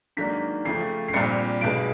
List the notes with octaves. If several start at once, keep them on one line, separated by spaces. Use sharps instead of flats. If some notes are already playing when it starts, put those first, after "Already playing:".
G#2 D#3 F#3 A#3 D4 B6
F2 C#3 F3 A3 C7
C7
A#1 A#2 G3 C4 C#7
B1 B2 G#3 D7